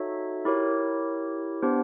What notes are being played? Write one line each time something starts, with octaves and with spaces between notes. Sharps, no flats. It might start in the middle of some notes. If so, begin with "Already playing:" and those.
Already playing: D#4 F#4 A4 C#5 E5
E4 G4 A#4 C#5
B3 D4 G4 C5